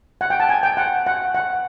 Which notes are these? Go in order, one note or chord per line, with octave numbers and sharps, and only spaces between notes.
F#5
G5
A5
G#5
G5
F#5
F#5
F#5